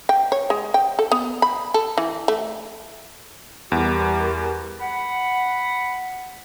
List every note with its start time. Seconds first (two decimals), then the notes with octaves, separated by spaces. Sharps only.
0.09 G5
0.32 C#5
0.50 G#3
0.74 G5
0.99 A4
1.12 B3
1.42 B5
1.74 A4
1.98 E3
2.28 A3
3.72 E2 G3 A#4
4.81 F#5 B5